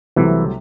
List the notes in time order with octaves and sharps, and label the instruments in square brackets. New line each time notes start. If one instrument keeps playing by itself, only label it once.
[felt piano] C2 C3 F#3 A3 [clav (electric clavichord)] E3